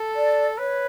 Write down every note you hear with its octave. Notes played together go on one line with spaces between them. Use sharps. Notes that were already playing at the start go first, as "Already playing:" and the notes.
Already playing: A4
D5
B4 C#5